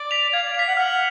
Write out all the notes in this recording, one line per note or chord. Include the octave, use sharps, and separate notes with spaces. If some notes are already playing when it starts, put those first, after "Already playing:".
Already playing: D5
B6 F7
F5 G#6
D5
F5 B6 F7
F#5
F#5 F6